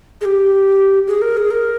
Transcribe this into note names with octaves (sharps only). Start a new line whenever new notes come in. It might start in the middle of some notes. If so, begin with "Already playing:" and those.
G#4
G4
G#4
A#4
G#4
A#4